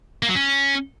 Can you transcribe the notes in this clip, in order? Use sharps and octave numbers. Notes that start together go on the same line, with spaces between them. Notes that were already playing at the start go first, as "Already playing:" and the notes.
A#3
F#3
C#4